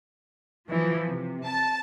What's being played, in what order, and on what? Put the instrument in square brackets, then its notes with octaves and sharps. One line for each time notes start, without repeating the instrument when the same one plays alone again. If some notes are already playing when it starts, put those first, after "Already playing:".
[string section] E3 F3
C3
A5